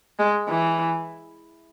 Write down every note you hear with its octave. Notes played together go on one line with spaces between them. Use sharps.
G#3
E3